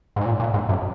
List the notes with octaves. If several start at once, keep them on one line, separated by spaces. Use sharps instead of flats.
G#2
A#2
A#2
G#2
F#2